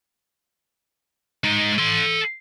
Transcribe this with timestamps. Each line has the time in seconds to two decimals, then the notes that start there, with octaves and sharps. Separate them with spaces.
1.44 G#3 D#4
1.78 A4 C6